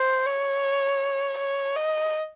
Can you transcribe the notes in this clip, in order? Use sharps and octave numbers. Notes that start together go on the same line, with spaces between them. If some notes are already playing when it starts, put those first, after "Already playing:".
Already playing: C5
C#5
C#5
D#5